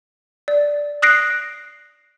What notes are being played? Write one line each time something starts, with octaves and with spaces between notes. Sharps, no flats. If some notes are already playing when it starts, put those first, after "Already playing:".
D5
D#6 F#6 A#6 C7 D7